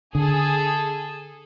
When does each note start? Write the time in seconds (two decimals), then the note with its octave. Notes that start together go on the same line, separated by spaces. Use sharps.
0.15 D3 G#4 A4